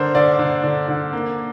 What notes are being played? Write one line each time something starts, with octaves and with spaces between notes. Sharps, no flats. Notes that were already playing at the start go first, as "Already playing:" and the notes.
Already playing: D3 D4 A#4 C5
D3 D5
D3
D3
D3
A#3